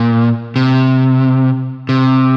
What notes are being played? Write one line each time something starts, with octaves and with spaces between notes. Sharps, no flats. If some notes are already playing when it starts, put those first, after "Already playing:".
Already playing: A#2
C3
C3